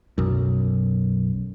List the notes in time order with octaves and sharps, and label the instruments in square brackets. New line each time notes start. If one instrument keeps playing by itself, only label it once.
[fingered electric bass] B1 F#2